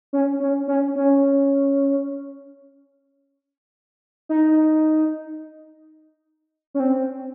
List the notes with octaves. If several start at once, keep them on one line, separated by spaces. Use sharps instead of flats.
C#4
C#4
C#4
C#4
D#4
C#4
C4